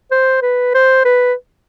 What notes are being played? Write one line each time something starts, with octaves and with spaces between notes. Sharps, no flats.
C5
B4
C5
B4